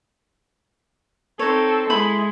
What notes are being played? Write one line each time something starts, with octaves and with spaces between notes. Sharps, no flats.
C4 D#4 A4 C#5
G#3 E4 B5 C6